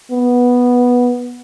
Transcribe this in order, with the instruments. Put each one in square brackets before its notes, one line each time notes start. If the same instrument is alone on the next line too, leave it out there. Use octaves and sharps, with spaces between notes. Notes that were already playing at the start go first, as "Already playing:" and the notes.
[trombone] B3